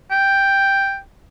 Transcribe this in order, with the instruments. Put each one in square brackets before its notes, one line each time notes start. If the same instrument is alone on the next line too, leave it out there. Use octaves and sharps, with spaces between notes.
[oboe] G5